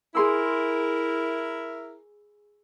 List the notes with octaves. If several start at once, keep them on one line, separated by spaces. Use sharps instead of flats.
E4 G#4 A#4 C6 E6